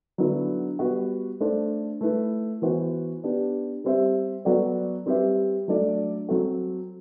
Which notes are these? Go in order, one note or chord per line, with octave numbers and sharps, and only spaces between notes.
D3 F#3 B3 E4 B4
G3 B3 F#4 B4
A3 D4 A4 C5
A3 E4 B4
E3 B3 F#4 C5
B3 D4 G4
G3 C4 G4 C5 E5
F#3 B3 F#4 A4 D5
G3 C4 G4 B4 E5
F#3 A3 D4 A4 D5
F#3 C4 F#4 A4